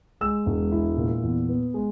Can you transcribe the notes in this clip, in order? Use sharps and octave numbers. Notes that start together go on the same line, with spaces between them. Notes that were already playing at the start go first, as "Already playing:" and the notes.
G#3 E6
E1
E4
A#2
E2
B3
G#3